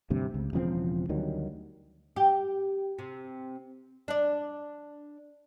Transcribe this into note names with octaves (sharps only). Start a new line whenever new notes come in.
D2 G2 C3
C#2
E1 C#3 F3 C4
D2 D#3 F#3 G3
G4
C3
D4 D5